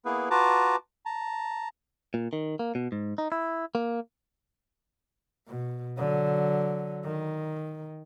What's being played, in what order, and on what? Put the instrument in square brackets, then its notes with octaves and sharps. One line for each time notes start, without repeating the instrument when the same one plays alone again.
[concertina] A#3 B3 E4 G#4 B4
F4 F#4 B4 A5 A#5 D6
A5 A#5
[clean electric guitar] A#2
D#3
A#3
B2
G#2
D#4
E4
A#3
[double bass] B2
D3 F#3
D#3